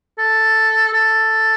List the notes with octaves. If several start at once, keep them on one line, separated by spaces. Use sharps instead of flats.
A4
A4